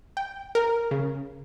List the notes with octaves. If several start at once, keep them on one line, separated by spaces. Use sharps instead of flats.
G5
A#4
C#3